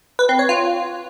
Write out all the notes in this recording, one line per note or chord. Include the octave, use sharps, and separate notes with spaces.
B4
C4
C#5
F4